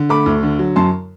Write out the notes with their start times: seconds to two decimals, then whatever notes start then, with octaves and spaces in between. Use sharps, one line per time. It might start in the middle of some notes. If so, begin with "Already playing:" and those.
Already playing: D3
0.09 A3 B5 D6
0.26 D2
0.43 D3
0.59 F#3
0.76 F#2 A5 C6